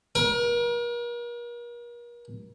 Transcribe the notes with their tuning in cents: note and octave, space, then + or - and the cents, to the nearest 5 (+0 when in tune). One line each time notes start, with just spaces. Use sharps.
A#4 +40